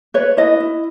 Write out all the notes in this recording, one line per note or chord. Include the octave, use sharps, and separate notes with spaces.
B4 C#5
E4 D#5
E4